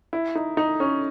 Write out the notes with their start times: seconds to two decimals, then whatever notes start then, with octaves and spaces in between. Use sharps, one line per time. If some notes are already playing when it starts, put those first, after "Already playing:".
0.13 E4
0.35 D#4
0.57 D#4
0.80 C#4